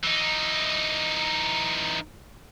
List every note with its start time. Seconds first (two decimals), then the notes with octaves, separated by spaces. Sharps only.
0.03 E3 D#4